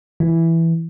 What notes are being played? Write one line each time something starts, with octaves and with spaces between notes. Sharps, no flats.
E3